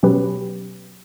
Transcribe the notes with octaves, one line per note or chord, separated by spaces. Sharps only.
B2 F#3 C#4 G4 B4